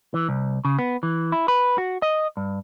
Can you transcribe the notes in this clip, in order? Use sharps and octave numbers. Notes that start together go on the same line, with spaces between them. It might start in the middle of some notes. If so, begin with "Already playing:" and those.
E3
C2
C#3
B3
E3
E4
B4
F#4
D#5
G2